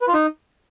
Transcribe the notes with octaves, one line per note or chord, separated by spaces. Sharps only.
B4
F4
D#4